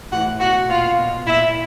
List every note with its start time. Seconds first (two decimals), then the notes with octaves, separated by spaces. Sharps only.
0.12 A2 E3 F#4 F#5
0.40 B2 F#4 F#5
0.69 A#2 F4 F5
0.98 B2
1.26 A#2 E4 E5